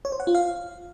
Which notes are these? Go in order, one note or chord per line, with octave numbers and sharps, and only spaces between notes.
C#5
C5
F#5
F4
F5